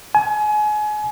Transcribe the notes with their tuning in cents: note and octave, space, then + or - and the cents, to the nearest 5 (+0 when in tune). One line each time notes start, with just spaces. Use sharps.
G#5 +30